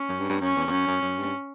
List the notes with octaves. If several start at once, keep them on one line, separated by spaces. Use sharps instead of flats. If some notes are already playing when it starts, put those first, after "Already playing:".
Already playing: C#4
F#2
G2
G2
F#2 C#4
E2
E2
F#2 C#4
F#2
F#2
G2